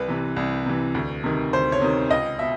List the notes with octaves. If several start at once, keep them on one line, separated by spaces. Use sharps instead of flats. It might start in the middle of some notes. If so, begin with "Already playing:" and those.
Already playing: C2 B4
C3 E3
C2
C3 E3
D2
C3 D#3
D2 C5
C#5
C3 D#3
C#2 D#5
B2 E5